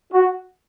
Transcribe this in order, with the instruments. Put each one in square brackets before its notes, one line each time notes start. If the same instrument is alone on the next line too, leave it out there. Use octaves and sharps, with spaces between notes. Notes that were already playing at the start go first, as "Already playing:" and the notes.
[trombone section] F#4